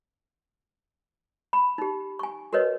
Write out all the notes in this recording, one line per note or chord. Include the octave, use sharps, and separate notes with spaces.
B5
D#4 G4
G#5 C#6
F#4 A#4 B4 C#5 D#5